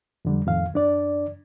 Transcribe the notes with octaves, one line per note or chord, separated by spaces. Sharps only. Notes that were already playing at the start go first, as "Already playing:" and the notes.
F2 D3 G3
F2 A2 D#3 F5
F#2 D4 D5